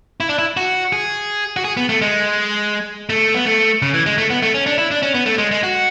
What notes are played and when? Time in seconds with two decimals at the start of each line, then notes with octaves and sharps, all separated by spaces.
0.20 E4
0.29 D4
0.38 E4
0.57 F#4
0.93 G#4
1.57 F#4
1.64 G#4
1.77 B3
1.89 A3
2.02 G#3
3.09 A3
3.34 B3
3.46 A3
3.82 C#3
3.94 E3
4.06 G#3
4.18 A3
4.30 B3
4.42 A3
4.55 C#4
4.66 D4
4.78 E4
4.91 D4
5.02 C#4
5.14 B3
5.26 A3
5.38 G#3
5.51 G#3
5.63 F#4